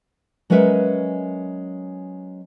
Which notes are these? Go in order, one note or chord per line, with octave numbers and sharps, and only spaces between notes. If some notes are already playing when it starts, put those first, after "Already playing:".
F#3 G#3 C#4 A#4 B4 E5